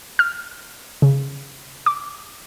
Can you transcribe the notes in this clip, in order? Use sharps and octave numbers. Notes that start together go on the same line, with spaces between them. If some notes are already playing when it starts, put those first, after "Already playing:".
F6
C#3
D6